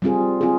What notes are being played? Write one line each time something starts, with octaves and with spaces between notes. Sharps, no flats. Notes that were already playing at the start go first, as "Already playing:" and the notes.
G3 C4 F4 G#4
C4 F4 G#4